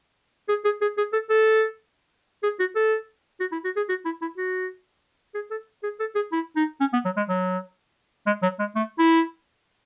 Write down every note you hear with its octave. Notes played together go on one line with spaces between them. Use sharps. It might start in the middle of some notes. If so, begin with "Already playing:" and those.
G#4
G#4
G#4
G#4
A4
A4
G#4
F#4
A4
F#4
E4
F#4
G#4
F#4
E4
E4
F#4
G#4
A4
G#4
A4
G#4
E4
D#4
C#4
B3
F#3
G#3
F#3
G#3
F#3
G#3
A3
E4